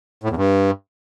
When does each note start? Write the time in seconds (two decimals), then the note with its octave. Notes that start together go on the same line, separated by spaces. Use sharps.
0.24 A2
0.30 E2
0.36 G2